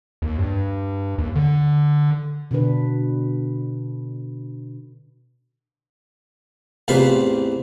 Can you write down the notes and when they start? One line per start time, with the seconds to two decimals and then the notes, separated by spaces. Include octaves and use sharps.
0.22 D#2
0.39 G2
1.18 D#2
1.35 D3
2.51 B2 D3 D4 B4
6.88 A1 E2 C3 F4 C5 B5